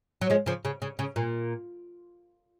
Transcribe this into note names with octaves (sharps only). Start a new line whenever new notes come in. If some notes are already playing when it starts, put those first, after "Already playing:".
F#3
F3 G#3
C#3 F3
C#3
C#3
C#3
A#2